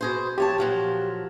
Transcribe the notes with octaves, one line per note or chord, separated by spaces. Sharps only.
B2 G#4 C5
F3 G4 C#5 A5
A#2 F3 F#3